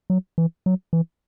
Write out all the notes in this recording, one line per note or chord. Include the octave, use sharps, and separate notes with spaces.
F#3
E3
F#3
E3